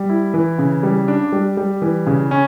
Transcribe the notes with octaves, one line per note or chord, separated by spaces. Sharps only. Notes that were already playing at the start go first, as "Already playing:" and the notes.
Already playing: G3
E4
E3
C#3
G3
D4
G3
G3
E3
C#3
C#4